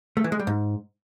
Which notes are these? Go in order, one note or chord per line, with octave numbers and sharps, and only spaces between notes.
A3
E3
G#3
G3
G#2